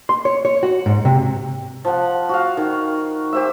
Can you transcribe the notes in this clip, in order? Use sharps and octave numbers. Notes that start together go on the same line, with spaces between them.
C6
C#5
C#5
F#4
G#2
C3
F3 F#5
F#4 F5
D#3
G4 C5 E5